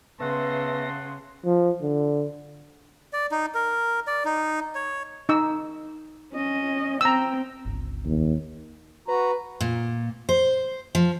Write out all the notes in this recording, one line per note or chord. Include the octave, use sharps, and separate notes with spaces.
C#3 B3 B4 E5 F#5 A5 C6 A#6
F3
D3
D5
D#4
A#4
D5
D#4
C#5
D#4 E6
C#4 D#5
C4 G5 A#5 E6
G1 C#2
D#2
F#4 B4 A#5
A#2
C5
F3